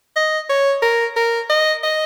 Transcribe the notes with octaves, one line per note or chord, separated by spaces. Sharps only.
D#5
C#5
A#4
A#4
D#5
D#5